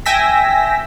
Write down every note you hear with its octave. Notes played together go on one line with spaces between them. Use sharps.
E5 G5 G#5 E6 A#6 B6